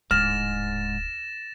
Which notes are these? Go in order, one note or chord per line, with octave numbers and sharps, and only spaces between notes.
D1 G#2 F6 A6 A#6 E7